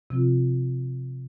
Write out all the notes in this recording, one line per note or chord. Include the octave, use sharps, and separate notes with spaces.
C3 F3 C4 F4